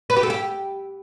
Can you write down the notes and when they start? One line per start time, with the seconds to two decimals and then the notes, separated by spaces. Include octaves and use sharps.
0.10 B4
0.16 G4
0.23 A4
0.30 G4